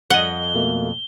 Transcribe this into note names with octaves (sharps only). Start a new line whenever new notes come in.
F2 D#5 F#5 G7
B2 A3 A#3